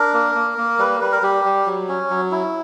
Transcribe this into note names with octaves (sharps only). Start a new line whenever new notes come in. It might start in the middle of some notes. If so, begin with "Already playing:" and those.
Already playing: D4 A#4
A#3
A#3
A#3
G3 B4
G3 B4
A#4
G3 G4
G3
F#3
C#4
F#3
E4